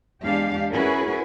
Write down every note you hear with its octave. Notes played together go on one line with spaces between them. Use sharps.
E2 G#3 D4 G4 F5
C#4 E4 F#4 G#4 A#4 B4